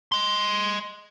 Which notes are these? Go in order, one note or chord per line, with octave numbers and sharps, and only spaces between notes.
D#5 C6